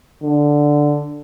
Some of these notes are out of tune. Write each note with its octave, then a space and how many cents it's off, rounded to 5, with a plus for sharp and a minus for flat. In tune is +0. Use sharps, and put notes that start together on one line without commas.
D3 +0